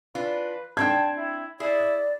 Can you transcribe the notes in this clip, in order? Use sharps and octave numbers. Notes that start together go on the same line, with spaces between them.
E3 D4 F4 B4
C4 D4 G5 A5 G#6
E4
E4 G#4 D5